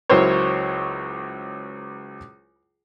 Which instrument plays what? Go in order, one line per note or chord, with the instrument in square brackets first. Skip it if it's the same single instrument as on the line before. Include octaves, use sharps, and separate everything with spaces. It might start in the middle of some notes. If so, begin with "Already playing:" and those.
[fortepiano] C#2 F#3 E4 A#4 C5 C#5